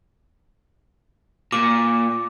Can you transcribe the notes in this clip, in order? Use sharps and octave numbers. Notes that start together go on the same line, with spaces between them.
A#2 D6